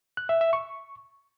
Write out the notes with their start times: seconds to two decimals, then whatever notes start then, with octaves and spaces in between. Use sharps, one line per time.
0.17 F#6
0.29 E5
0.41 E5
0.53 C#6